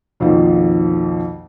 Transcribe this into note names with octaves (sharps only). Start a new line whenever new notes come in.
B1 F2 D#3 F3 A#3